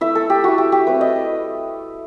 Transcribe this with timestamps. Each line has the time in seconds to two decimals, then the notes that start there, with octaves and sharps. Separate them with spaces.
0.01 A3 E4 E5
0.15 A4
0.30 G4
0.44 A3 E4 F#4
0.58 G4
0.72 G4
0.87 G3 C4 E4 B4
1.01 D#5